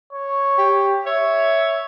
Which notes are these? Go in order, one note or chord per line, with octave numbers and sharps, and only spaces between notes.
C#5
G4
C#5 E5